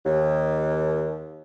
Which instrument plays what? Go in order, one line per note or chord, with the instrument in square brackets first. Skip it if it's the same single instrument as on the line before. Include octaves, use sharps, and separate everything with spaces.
[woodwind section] D#2